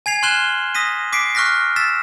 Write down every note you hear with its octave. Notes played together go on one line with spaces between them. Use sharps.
G#5 G#6 C7 F7
C6 F6 F#6 E7 F#7 G7
D#6 A#6 B6 D#7
D6 B6 C7 D7
C#6 F6 F#6 A#6 B6
E6 A6 B6 E7